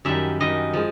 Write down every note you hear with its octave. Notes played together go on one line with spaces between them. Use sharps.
F#2 D#3 G3 E5
F#2 D#3 G3 D#5
F3 G#3